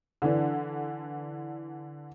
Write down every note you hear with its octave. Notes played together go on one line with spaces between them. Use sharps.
D3 E3 D4